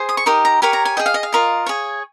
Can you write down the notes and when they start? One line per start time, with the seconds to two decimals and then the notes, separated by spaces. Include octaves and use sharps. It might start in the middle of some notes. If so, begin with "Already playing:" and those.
Already playing: G#4 C5
0.09 D#6
0.17 C#6
0.26 D#4 G4 A#4 D#6
0.45 A#5
0.62 G4 A#4 C#5 G#5
0.73 A#5
0.85 G#5
0.97 G#4 D#5 G5
1.06 F5
1.14 D#5
1.23 F5
1.32 F4 A#4 D#5
1.66 G#4 C#5